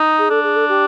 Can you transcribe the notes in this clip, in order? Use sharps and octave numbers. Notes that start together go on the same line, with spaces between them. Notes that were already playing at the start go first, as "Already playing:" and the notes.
Already playing: D#4
G#4
D4 A4
G#4
A4
G4